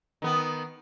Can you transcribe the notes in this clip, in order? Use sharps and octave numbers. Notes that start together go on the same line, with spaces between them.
D#3 B3